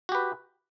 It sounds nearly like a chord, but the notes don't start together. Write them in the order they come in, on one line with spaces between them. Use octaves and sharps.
F#4 G4 B4